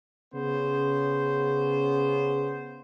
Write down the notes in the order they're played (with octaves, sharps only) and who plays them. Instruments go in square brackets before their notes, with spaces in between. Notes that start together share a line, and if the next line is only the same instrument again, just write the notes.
[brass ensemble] C#3 B3 C#4 C5